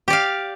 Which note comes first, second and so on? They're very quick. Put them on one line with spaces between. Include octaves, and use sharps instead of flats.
G4 D5 F5